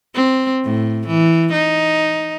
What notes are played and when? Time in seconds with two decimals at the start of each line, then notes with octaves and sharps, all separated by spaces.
0.14 C4
0.64 A2
1.07 E3
1.53 D#4